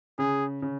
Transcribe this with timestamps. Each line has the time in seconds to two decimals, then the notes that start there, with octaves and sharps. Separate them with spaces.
0.19 C#3 G#4
0.62 C#3